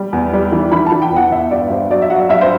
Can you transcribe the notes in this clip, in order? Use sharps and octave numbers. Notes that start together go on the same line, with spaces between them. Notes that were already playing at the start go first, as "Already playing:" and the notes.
Already playing: G3
E2
G3
E3
E3 B5
A5
E3
G5
E2 F#5
G1 E5
G2 D5
G2 C5
F#3 D5
E5
F#3 F#5
G2 E5
C5